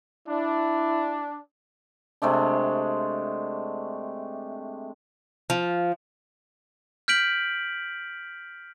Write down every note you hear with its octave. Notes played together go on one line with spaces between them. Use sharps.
D4 E4
C3 G#3 A3 D4
F3
F6 G6 B6 D7 F#7